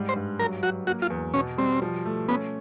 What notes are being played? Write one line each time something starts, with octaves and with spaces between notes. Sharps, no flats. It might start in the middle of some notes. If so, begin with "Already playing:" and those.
Already playing: G#2 G3
C5
G2
F#3 A#4
F#3 F#4
A#3 F#4
F4
E2
B2 C#4
G3 C4
F3
A3
B3 C#4